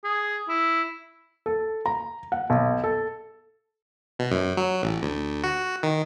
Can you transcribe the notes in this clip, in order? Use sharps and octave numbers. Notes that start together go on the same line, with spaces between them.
G#4
E4
A4
A#5
F#5
B1
A4
B2
F#2
F#3
A1
D2
F#4
D#3